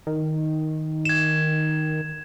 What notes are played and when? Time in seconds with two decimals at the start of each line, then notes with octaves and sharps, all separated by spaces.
0.07 D#3
1.05 G#6 E7